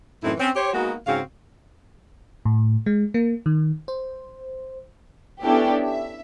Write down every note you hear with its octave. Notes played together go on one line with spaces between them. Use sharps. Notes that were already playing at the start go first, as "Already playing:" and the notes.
F#2 A2 E3 C4 D#4 E4
C4 C#4
G4 C5 C#5
G#3 A#3 B3 D#4 F#4
G#2 C#3 C4 F#4 F5
A2
G#3
A#3
D#3
C5
B3 C#4 D4 E4 G4 A4
E5